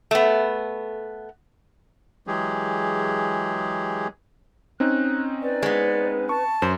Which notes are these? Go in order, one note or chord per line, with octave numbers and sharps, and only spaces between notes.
A3 B3
E3 F#3 G#3 G4 G#4
C4 C#4 D#4 F#6
B4 D5
G#3 B3
A5 C#6
F#2 C5